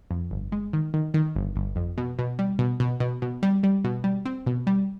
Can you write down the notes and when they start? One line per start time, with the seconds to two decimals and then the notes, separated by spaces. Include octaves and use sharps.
0.11 F2
0.31 G1
0.52 G#3
0.73 D#3
0.94 D#3
1.14 D#3
1.36 G1
1.56 G1
1.76 F2
1.98 B2
2.19 B2
2.39 G3
2.59 B2
2.80 B2
3.00 B2
3.22 B2
3.43 G3
3.63 G3
3.84 B2
4.04 G3
4.26 C4
4.47 B2
4.67 G3